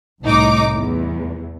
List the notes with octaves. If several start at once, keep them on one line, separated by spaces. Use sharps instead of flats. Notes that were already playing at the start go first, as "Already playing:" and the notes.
C2 A2 D#4 D6
E2